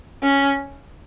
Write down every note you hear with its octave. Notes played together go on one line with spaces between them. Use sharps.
C#4